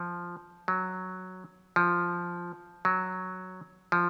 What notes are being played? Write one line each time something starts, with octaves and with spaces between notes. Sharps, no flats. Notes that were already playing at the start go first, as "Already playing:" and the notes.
Already playing: F3
F#3
F3
F#3
F3